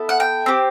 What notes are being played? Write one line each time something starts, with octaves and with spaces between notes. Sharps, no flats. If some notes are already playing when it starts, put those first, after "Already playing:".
Already playing: B3 E4 A4
F#5
G5
C4 G4